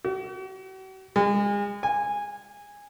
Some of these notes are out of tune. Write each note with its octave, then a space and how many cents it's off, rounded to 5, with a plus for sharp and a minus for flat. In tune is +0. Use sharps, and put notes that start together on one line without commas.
F#4 +45
G#3 -35
G#5 -15